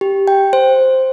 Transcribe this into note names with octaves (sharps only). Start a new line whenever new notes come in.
G4
G5
C5